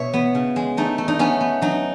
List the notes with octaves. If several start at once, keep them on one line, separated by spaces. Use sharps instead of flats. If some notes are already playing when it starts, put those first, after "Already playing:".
Already playing: B2 C#5 E5
B3
C#3
G#3
A3 D#4
A3
D#4
B3 C#4
B3
F#3 D#4